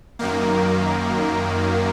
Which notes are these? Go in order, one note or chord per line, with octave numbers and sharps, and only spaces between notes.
F#2 D#3 A#3